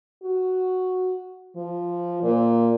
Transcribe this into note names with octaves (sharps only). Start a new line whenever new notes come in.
F#4
F3
A#2